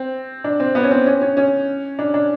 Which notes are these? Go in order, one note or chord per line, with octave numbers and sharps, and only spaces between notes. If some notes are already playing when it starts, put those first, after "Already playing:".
Already playing: C4
D4
C4
B3
C#4
C4
C#4
C#4
C#4
D4
D4